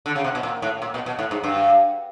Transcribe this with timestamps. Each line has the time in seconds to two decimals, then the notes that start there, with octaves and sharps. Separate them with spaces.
0.06 D3
0.16 C#3
0.24 C3
0.35 B2
0.43 A#2
0.62 A2
0.82 A#2
0.94 B2
1.06 B2
1.19 A2
1.31 G#2
1.44 G2